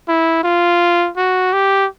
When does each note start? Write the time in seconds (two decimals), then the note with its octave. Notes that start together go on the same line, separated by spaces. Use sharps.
0.08 E4
0.44 F4
1.17 F#4
1.53 G4